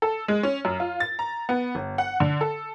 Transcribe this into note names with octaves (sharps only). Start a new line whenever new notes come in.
A4
G#3
C#4
F#2
F4
A6
A#5
B3
G1
F#5
D3
A4